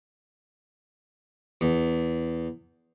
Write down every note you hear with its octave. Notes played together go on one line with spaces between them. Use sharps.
E2